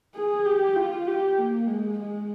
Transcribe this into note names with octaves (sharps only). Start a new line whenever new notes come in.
G#4
G4
F4
G4
A#3
G#3
G#3